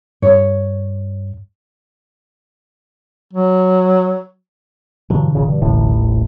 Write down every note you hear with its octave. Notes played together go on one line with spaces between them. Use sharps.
G2 C#5
F#3
G2 B2 D3 E3 F#3
F#1 A#2 C#3
G2
D#1 A1 A2